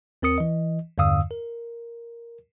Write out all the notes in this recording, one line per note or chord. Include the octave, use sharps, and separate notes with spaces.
D#2 C4 A#4 D#6 C#7
E3 D#5
E2 G2 D3 F5 D#6 E6
A#4